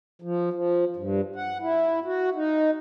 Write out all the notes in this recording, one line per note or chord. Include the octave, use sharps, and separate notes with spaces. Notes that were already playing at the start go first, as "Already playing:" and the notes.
F3
F3
G2
F#5
E4
F#4
D#4